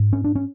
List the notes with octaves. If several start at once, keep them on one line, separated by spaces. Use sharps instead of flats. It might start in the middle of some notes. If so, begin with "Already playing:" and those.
Already playing: G#2
C#4
D4
C#4